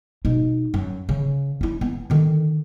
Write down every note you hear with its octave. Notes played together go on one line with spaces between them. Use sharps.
B2 D#4
F#2
C#3
C#4 E4
B3
D3 D#3